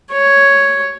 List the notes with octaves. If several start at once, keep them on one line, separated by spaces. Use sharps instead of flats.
C#5